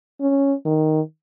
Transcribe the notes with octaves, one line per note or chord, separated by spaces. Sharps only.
C#4
D#3